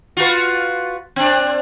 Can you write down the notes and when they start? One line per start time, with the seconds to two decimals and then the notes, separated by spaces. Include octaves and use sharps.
0.17 F4 F#4 B4
1.16 C4 D4